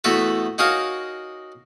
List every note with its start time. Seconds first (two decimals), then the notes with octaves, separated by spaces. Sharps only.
0.04 E2 A3 B3 F#4 B4
0.58 D#4 F#4 G#4 A#4 C#5 F5